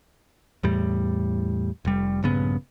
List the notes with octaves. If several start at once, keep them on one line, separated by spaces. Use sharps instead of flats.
E2 A2 G3
F1 G3
A#1 G2 C#3 B3